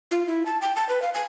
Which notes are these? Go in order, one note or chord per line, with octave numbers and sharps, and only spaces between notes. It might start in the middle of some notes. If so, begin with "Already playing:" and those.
F4
E4
A5
G5
A5
B4
F5
G#5